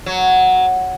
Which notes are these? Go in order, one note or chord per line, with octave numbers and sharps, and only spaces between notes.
F#3